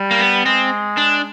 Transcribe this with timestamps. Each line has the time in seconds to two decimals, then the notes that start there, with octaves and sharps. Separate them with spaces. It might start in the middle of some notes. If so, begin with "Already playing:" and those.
Already playing: G3
0.11 A#3
0.19 B3
0.45 G#3 C4
0.97 D4